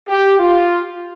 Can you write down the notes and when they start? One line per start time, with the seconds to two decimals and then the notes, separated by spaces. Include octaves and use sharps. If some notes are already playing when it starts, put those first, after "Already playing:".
0.09 G4
0.39 F4